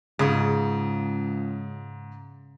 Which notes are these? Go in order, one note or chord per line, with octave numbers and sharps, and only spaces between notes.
C#2 G#2 C#3 D#6